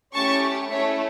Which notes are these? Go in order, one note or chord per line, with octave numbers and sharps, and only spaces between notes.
A3 C#4 E4 G4 A5 C#6
A3 C#4 E4 A4 C#5 E5